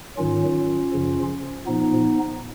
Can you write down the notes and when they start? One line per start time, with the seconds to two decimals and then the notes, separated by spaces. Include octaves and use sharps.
0.17 G#2 D#3 F#3 C#4 F4
0.93 F#2 C#3 F3
1.66 A#2 F3 B3 D#4